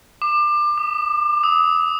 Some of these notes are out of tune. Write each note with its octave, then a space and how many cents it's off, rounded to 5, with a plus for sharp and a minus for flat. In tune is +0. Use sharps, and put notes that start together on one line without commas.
D6 +25
D#6 -35
D#6 +45